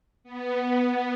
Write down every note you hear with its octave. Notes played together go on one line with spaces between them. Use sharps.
B3